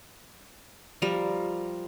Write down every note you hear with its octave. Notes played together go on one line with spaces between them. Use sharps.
F3 G3 A#4